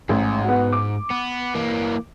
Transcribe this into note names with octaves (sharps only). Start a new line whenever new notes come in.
A1 G#2
B3 F#4
D6
B3
E3 A#3